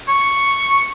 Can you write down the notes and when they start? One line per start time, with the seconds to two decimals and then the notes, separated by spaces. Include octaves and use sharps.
0.09 C#6